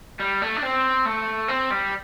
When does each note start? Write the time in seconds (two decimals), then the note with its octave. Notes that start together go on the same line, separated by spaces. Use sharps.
0.20 G3
0.42 A3
0.57 D4
0.63 C4
1.06 A3
1.48 C4
1.71 G3